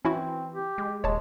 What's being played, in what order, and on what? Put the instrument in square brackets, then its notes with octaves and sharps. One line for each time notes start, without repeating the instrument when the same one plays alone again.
[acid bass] E3 [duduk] C4 [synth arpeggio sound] C#4 E4 F#4
[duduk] G4
[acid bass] G#3
[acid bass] D#1 [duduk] G#3 [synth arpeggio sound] C#5 A5